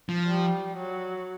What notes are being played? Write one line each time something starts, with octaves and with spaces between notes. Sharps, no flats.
F3
G3
F#3